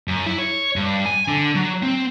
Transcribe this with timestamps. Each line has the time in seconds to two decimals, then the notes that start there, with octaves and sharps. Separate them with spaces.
0.08 F#2
0.26 E4
0.38 C#5
0.76 G2
1.06 G#5
1.28 D3
1.55 F#3
1.83 C4